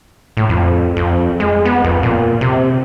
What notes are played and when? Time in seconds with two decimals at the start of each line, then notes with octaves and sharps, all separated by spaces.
0.37 A2
0.49 F2
0.97 F2
1.40 G#3
1.65 B3
1.85 F2
2.03 A#2
2.41 C3